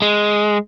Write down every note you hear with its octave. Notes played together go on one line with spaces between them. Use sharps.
G#3